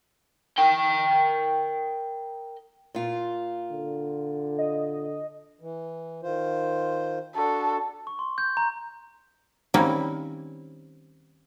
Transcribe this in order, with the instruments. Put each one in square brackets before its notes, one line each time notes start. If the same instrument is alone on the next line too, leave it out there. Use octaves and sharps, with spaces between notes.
[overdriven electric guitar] A#4 G5
[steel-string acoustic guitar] A#2 F4
[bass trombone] D3
[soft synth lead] D#5
[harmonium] E3
D#3 F4 C5
[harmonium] D4 F#4 [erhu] A4
[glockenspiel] C#6
C6
G6
A#5
[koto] D#3 G3 A#3 C4 C#4 E4